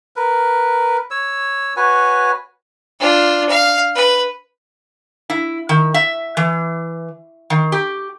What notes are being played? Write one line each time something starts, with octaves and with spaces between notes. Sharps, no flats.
A#4 B4
C#5 E6
F#4 B4 C#5 G#5
D4 F4
F5
B4
E4
D#3
E5
E3
D#3
G4